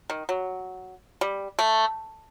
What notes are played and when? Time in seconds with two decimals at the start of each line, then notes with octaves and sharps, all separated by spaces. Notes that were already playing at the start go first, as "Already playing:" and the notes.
0.10 D#3
0.29 F#3
1.21 G3
1.59 A3